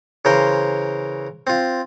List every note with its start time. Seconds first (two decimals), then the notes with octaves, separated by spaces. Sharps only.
0.25 C#3 E3 A#4 C5 C6
1.47 C4 F4